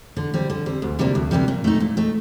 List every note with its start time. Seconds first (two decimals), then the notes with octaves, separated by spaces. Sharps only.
0.17 D3
0.34 G3 C4
0.50 D3
0.66 G3 C4
0.82 D2
0.99 C3 G3 A#3 D4
1.15 D2
1.31 C3 G3 A#3 D4
1.48 A#2
1.64 A3 D#4
1.80 A#2
1.97 A3 D#4